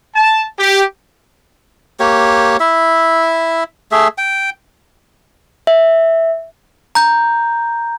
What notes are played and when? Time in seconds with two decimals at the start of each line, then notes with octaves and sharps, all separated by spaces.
0.15 A5
0.59 G4
2.00 A#3 G4 C#5
2.60 E4 E5
3.92 A3 G#4 E5
4.18 G5
5.67 E5
6.95 A#5 G6